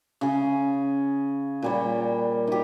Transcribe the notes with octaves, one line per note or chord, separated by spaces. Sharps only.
C#3 G#4
A#2 G3 C#5
D#3 G4